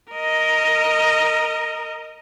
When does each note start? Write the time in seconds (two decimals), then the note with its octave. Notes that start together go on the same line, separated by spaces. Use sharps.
0.12 A#4 D#5